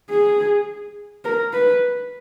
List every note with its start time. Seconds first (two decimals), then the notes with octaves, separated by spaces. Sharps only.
0.10 G#4
1.25 A#4
1.53 B4